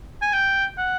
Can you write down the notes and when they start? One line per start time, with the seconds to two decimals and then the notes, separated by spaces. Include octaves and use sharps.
0.22 G#5
0.33 G5
0.78 F#5